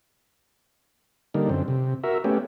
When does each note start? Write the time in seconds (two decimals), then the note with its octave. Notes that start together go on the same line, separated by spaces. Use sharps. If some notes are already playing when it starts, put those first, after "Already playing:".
1.34 D3 G3 A#3 D#4
1.49 F#2 D3 C4
1.68 C3
2.04 F#4 A#4 E5
2.24 A3 B3 C#4 G4